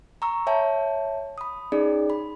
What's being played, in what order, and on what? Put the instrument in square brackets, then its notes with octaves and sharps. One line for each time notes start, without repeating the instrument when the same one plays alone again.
[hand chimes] A#5 C#6 E6
C#5 E5 G5 A5
B5 D#6
C#4 D#4 G#4 D5
B5